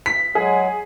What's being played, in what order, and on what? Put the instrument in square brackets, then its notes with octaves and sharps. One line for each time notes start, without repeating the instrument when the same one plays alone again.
[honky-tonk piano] B6
[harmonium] F#3 G#3 [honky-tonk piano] G#4